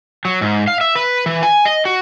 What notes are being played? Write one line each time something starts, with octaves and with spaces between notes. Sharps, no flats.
F#3
G#2
F5
E5
B4
E3
G#5
D#5
F#4